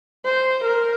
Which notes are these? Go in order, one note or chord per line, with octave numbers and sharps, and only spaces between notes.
C5
A#4